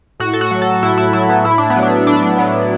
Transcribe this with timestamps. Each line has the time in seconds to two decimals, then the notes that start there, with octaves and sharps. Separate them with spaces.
0.20 A2 F#4
0.33 A4
0.41 F#4
0.51 F#3
0.62 A4
0.83 A2 E4
0.98 E4
1.13 F#3 E4
1.29 B3
1.44 A2 E4
1.58 D4
1.70 B3
1.76 F#3
1.83 D4
2.07 A2 D4
2.23 D4
2.38 F#3 B3